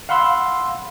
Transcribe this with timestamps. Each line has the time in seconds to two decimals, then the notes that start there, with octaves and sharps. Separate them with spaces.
0.09 F5 F#5 B5 C6 E6